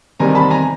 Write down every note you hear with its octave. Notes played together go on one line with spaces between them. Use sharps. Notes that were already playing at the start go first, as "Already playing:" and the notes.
E2 C3 D#3 G3 G#5 A#5
A5 B5
G#5 A#5